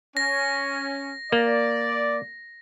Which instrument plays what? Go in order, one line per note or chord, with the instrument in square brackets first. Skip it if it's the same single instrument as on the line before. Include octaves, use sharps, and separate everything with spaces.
[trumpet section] C#4 [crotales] A#6
[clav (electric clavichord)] A#3 [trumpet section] D5